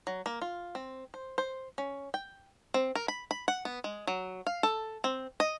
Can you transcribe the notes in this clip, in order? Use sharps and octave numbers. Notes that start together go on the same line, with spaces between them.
F#3
A#3
F4
C4
C5
C5
C#4
G5
C4
A#4
B5
B5
F#5
B3
G#3
F#3
F5
A4
C4
D#5